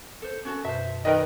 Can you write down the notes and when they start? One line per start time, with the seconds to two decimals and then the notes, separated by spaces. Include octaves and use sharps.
0.22 A4 C5
0.45 C#4 F#4 A4
0.64 F#2 B2 C5 E5 A5
1.05 D#3 A#4 B4 D5 D#5 G5